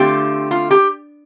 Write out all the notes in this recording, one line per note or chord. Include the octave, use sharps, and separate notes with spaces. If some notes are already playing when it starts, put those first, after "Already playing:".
Already playing: D3 A3 C4 F4 G4
F4
G4